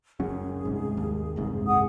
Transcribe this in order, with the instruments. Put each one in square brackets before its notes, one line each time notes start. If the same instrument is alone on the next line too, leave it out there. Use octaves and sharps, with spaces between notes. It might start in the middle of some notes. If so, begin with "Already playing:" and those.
[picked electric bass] F#1 F#3 C#4 [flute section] G#4
[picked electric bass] C2 G#2
D#2
F#1 C2 G#2
[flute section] G#4 F#5 D#6